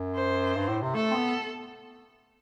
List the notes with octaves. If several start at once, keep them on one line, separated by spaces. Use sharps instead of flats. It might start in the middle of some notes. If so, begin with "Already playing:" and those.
Already playing: F#2
C5
G2
A2
C3
A3 A4
C4
B3